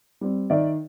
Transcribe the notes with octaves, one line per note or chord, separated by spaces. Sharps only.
G3 C4
D#3 D5 E5